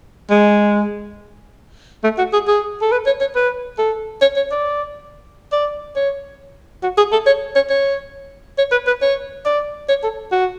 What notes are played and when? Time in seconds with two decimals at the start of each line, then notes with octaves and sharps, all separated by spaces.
0.30 G#3
2.04 A3
2.18 F#4
2.33 G#4
2.48 G#4
2.82 A4
2.92 B4
3.07 C#5
3.21 C#5
3.36 B4
3.79 A4
4.22 C#5
4.36 C#5
4.52 D5
5.53 D5
5.96 C#5
6.83 F#4
6.98 G#4
7.13 A4
7.27 C#5
7.56 C#5
7.70 C#5
8.58 C#5
8.72 B4
8.87 B4
9.02 C#5
9.45 D5
9.89 C#5
10.03 A4
10.32 F#4